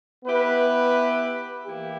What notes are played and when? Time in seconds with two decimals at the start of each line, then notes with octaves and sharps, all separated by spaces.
0.24 B3 E4 G4 B4 E5
1.66 E3 A#3 E4 G4